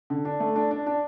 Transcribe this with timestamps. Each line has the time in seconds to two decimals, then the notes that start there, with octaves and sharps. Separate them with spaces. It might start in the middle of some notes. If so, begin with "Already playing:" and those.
0.10 D3
0.25 D4
0.40 A3
0.56 D4
0.71 D4
0.86 D4